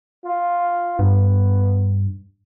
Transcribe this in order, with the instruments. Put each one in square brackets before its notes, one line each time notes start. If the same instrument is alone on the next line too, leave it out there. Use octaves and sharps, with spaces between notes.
[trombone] F4
[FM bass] G2 [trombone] B3